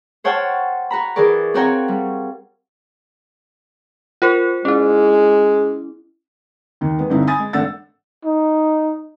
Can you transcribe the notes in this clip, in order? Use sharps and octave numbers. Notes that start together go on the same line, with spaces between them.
C5 C#5 F#5 G5 A5 F6
F#4 A#5 B5
E3 G#4 A#4 D5 C#6
C4 F4 F#4 C#5 G5 A#5
G3
F4 A#4 C5
G#3 C#4 E4
D#2 D#3
G#3 B3
G2 D3 C4 D#4 E4
G#5 B5 D#6 A6
G#3
G#1 A3 D4 F#5 E6 A6
D#4